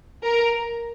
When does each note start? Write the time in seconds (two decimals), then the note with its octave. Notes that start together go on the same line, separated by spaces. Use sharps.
0.23 A#4